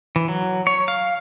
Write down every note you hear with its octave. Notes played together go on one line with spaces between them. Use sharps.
E3
F#3
C#5
F5